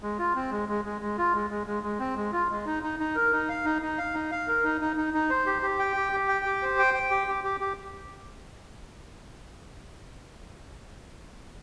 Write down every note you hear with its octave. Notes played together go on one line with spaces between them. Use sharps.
G#3
F4
C4
G#3
G#3
G#3
G#3
F4
G#3
G#3
G#3
G#3
C4
G#3
F4
G#3
D#4
D#4
D#4
A#4
D#4
F5
D#4
D#4
F5
D#4
F5
A#4
D#4
D#4
D#4
D#4
C5
G4
G4
G5
G4
G4
G5
G4
C5
G5
G5
G4
G4
G4
G4